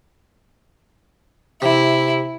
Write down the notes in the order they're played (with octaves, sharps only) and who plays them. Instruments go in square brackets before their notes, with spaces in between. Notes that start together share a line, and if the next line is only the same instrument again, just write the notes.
[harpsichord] C3 [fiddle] E4